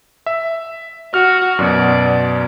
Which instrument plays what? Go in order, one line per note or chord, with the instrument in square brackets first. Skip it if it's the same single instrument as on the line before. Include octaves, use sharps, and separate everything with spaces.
[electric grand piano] E5
[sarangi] F#4 [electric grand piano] F6
[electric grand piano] F#2 B2 [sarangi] D5